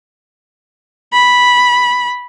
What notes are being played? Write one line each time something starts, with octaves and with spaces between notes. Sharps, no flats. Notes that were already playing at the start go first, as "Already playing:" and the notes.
B5